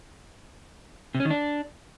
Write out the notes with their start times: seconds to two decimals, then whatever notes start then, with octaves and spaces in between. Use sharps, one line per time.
1.15 C3
1.20 C#4
1.25 D#3
1.30 D4